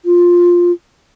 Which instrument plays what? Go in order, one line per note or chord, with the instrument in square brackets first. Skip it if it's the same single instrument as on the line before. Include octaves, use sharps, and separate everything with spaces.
[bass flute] F4